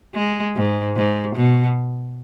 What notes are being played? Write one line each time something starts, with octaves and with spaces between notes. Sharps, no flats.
G#3
G#2
G#2
B2